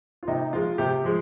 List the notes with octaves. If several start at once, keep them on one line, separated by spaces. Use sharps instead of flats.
F4
C3 D#4
F3 G#3 F4
C3 G4
F3 G#3